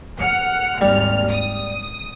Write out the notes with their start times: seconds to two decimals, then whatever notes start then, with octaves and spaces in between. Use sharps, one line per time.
0.21 F#5 F6 C#7
0.81 G#1 D#2 G3 F6
1.31 D#6